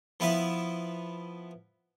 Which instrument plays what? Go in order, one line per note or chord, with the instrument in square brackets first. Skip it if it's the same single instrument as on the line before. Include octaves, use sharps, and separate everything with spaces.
[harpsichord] F3 B3 E4 B4 E5